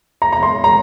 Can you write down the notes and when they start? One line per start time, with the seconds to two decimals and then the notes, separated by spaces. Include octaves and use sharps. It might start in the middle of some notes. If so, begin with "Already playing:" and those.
0.22 A#5
0.32 A#5
0.43 C6
0.64 A#5